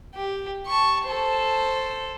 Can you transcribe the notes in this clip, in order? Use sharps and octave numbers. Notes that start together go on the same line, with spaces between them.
G4
A5 C#6
A4 C5